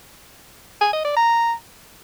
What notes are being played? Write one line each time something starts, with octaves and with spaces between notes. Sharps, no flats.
G#5
D#5
D5
A#5